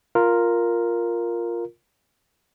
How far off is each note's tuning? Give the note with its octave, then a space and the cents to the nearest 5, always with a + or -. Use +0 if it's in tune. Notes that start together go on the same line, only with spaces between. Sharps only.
F4 +0 A#4 +0